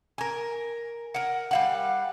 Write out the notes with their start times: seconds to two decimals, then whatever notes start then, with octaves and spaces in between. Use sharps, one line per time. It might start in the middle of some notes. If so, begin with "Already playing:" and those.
0.18 A#4 G#5
1.14 A#4 F#5
1.51 G3 F5 F#5